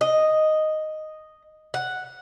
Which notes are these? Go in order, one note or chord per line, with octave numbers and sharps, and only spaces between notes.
D#5
F#5